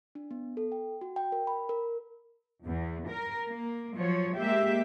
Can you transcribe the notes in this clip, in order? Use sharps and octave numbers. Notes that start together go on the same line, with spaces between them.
D4
B3
A4
G5
F#4
G5
A#4
B5
A#4
E2
A#4
A#3
F3 F#3 C#5
G#3 A#3 G4 E5